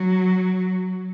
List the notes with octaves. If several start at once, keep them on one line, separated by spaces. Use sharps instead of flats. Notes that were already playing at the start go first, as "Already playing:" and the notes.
Already playing: F#3